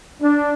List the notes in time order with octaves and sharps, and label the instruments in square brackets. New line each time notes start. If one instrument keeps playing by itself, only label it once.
[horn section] D4